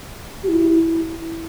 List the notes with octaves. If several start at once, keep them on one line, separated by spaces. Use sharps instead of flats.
G4
E4